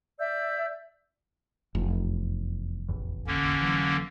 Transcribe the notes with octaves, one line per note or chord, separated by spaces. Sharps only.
D5 E5 E6 G6
F1 E2
A1 E2 E3
D3 A#3 C#4
E3 F#3